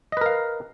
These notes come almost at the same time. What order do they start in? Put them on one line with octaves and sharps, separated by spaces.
D#5 B4 A#4 F5